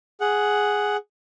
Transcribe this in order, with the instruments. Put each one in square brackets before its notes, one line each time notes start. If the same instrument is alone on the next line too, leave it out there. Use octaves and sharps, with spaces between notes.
[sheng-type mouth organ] G#4 F#5